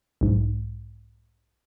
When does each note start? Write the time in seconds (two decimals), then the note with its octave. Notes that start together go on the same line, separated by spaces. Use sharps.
0.21 B1 G#2